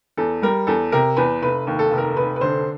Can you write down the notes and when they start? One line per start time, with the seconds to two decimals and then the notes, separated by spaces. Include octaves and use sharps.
0.17 E2 A4
0.42 G3 A#4
0.67 E2 A4
0.92 C3 A#4
1.17 E2 B4
1.42 F1 B4
1.67 D#2
1.79 A4
1.91 F1
1.98 A#4
2.16 F1 B4
2.36 B4
2.41 D3 C5